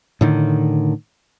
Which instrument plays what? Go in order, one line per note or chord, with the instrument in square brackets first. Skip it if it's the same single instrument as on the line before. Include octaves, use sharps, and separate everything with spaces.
[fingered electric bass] A2 D3 D#3